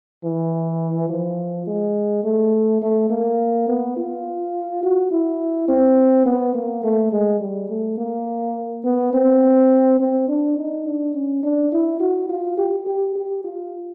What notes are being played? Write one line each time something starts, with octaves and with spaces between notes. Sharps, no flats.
E3
F3
G#3
A3
A3
A#3
B3
F4
F#4
E4
C4
B3
A#3
A3
G#3
G3
A3
A#3
B3
C4
C4
D4
D#4
D4
C#4
D4
E4
F#4
F4
G4
G4
G4
F4